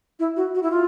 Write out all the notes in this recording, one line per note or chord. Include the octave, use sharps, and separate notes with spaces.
E4
F#4
F#4
E4
F4